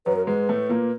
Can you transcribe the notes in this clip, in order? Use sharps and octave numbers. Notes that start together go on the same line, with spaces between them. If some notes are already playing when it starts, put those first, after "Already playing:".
F#2 F#3 B4
A#4
G#2 G#3 B4
A2 A3
A#2 A#3